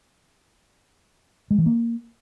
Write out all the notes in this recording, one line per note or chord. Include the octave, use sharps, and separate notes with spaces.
G#3
E3
A#3